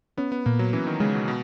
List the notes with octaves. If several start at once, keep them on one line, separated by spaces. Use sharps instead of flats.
B3 C#4
B3
A#2 A#3
F#3
E3 C#4
D#3
C#3 G#3
B2
B2